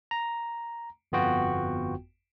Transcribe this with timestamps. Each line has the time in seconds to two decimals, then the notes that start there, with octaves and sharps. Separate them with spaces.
0.11 A#5
1.12 G1 F2 B3 F4 F#4 G5